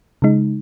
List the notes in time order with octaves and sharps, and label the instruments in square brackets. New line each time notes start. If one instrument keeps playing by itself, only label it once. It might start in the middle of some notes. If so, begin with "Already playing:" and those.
[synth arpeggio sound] C#3 G#3 D#4